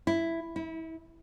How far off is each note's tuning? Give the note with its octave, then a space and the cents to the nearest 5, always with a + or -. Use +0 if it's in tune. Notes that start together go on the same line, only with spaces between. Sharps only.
E4 +5
E4 -30